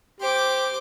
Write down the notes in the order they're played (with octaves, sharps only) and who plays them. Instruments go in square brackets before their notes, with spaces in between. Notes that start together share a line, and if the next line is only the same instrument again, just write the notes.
[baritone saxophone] G4 [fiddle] C5 D6